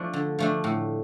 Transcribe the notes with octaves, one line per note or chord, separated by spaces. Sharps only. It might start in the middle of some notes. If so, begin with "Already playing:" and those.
Already playing: F3 A3 D4
D3
F3 A3 D4
A2